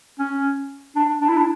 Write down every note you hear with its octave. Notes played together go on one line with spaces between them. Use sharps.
C#4
D4
D4
E4
D4